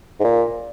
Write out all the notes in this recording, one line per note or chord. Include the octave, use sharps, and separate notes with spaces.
G#2
A#2